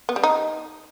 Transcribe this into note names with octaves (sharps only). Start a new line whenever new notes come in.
B3
G3
D#4